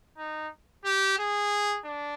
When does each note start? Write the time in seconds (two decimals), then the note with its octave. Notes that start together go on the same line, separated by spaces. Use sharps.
0.18 D#4
0.85 G4
1.18 G#4
1.86 D4